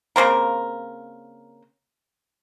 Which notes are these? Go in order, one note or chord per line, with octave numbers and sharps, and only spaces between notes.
C#3 A#3 C4 A#4